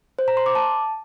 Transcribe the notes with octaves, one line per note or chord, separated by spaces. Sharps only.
C5
A#5
C6
D6
A5